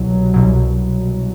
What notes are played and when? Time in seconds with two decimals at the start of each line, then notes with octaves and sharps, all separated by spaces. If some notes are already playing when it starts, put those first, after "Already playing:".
Already playing: C2 B2 F#3
0.34 C2 B2 F#3